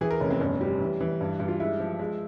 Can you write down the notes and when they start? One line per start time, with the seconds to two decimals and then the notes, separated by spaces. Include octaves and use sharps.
0.01 E3 G#4
0.11 A#4
0.20 F1 C#4
0.30 C4
0.40 G1 C#4
0.61 G3
0.80 E3
1.00 E3
1.21 G2
1.40 G2
1.48 F4
1.60 G#3 E4
1.80 F3
1.99 G#3